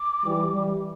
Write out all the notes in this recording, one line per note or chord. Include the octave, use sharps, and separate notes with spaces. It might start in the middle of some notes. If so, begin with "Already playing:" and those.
Already playing: D6
E3 G3
E3 G3